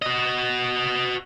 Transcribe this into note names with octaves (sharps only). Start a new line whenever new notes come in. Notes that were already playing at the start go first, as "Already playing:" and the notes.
F#4 D#5